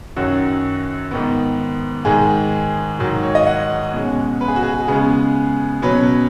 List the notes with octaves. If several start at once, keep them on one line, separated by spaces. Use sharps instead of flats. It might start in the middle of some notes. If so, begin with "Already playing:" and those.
F#2 D#3 F#3 C#4 F#4
G#2 D#3 B3
G#2 D#3 G#3 G#4
G#2 D#3 F#3
C#5
D#5
F#5
B2 G#3 C#4
B4
G#4
F#4
G#4
C#3 G#3 B3 G#4
B2 F#3 C#4 B4